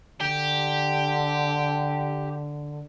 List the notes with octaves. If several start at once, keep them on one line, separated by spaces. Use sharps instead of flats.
D3 G4